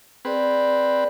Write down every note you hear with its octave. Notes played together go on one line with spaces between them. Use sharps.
C4 G#4 B4 D5